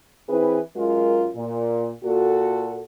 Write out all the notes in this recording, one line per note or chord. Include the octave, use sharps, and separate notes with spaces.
E3 C4 E4 G#4 B4
F#2 G#3 F4 A#4
A#2
A#2 F#4 A4